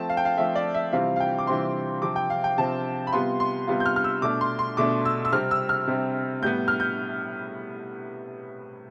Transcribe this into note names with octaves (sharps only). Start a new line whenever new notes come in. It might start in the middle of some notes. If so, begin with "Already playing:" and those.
Already playing: F3 A3 C4 A5
F5
G5
F5
F3 A3 C4 E5
D5
E5
C3 E3 G3 C4 F4 F5
F5
G5
D6
C3 E3 G3 C4 F4 C6
C3 F3 C4 D6
G5
F5
G5
C3 F3 C4 A5
B5
C3 G3 B3 F4 C6
C6
C3 G3 B3 F4
G6
F6
F6
E6
B2 A3 D4 D6
C6
C6
B2 A3 D4 D6
E6
E6
C3 G3 C4 F6
E6
F6
C3 G3 C4
A2 G3 B3 G6
F6
G6